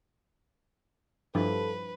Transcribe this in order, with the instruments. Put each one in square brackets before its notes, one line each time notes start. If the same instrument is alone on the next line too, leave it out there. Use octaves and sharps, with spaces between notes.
[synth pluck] G2 [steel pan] F3 G3 E4 [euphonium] A4 [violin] B4